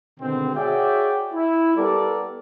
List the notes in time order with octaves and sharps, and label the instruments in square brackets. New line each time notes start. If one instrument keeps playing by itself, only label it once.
[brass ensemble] B2 D3 D#3 G#3 C4
F#4 G#4 C#5 D5 E5 G5
E4
G3 B3 A4 A#4 D5